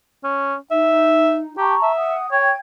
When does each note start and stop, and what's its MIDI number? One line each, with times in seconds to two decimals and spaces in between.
0.24 0.55 61
0.71 1.56 63
0.71 1.38 76
1.58 1.75 67
1.58 1.92 81
1.58 1.92 82
1.58 1.92 85
1.82 2.16 76
1.96 2.31 78
1.96 2.31 87
2.31 2.51 73
2.31 2.57 79
2.31 2.57 92